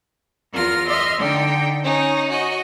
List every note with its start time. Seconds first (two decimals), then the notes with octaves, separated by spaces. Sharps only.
0.53 E2 F4 A#4 F6 A#6
0.87 D#5 E5 C6 F6
1.18 D3 D#4 G5
1.83 C#4 D#4
2.29 F#4 D#5